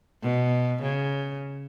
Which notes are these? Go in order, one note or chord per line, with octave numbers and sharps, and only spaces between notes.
B2
C#3